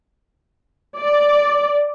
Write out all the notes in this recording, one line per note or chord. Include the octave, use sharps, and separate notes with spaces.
D5